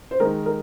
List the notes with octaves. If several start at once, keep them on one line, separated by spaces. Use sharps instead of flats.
C5
D#3 G#3 D#4 A#4
A#4